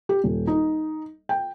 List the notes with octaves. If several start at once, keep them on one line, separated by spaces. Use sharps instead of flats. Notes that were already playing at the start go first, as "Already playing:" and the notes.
G4
D#1
D#4
G5